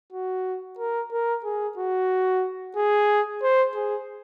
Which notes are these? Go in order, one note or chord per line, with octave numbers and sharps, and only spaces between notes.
F#4
A#4
A#4
G#4
F#4
G#4
C5
G#4